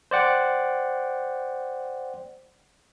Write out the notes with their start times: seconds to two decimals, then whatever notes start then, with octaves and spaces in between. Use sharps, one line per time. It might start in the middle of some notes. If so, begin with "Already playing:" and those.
0.11 C5 D5 F#5 G5